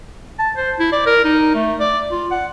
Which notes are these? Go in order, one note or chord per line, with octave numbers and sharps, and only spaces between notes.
A5
C5
E4
D5
A#4
D#4
A3
D5
F4
F#5